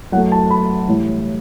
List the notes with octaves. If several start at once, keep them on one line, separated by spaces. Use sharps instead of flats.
F#2 F#3 A3 F#5
A5
B5
A2 E3 G3